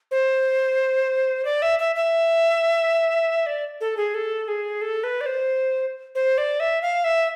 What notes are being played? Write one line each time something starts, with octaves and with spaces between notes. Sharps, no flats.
C5
D5
E5
E5
E5
D5
A4
G#4
A4
G#4
A4
B4
D5
C5
C5
D5
E5
F5
E5